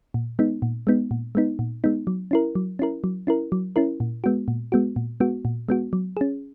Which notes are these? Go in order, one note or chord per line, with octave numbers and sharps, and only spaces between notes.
A#2
G#3 B3 D#4
A#2
G#3 B3 D#4
A#2
G#3 B3 D#4
A#2
G#3 B3 D#4
F#3
C#4 E4 A#4
F#3
C#4 E4 A#4
F#3
C#4 E4 A#4
F#3
C#4 E4 A#4
A#2
G#3 B3 F#4
A#2
G#3 B3 F#4
A#2
G#3 B3 F#4
A#2
G#3 B3 F#4
F#3
C#4 G#4